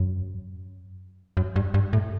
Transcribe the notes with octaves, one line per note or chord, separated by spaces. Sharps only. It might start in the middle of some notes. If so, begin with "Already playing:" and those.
Already playing: F#2
F#2
G2
G2
A2